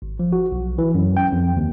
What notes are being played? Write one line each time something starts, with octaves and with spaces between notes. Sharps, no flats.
G#1
F3
F#4
B1
E3
F#2
G5
F2
D#2